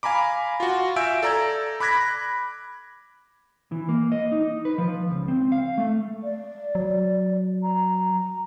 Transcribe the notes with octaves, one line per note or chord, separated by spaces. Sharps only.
F5 G#5 A#5 B5 D6
F4 F#4
E5 F5 G#5 E6 G6 D7
A4 D5 A#5 E6 G#6
B5 D6 F#6 G#6 A#6 B6
E3
A#3
D#5
D#4
B4
F3
C#2
C4
F5
A3
D5
F#3
A#5